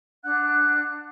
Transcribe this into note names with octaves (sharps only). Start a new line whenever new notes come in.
D4 F#5 F#6